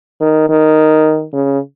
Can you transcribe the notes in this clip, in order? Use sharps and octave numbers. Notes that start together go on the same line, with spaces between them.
D#3
D#3
C#3